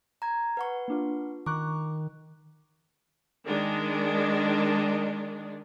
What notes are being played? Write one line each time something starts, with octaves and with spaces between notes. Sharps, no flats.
A#5 G#6
B4 F#5 C#6
A#3 D4 F4
D#3 A#5 C#6 D6 F#6
D#3 G#3 D4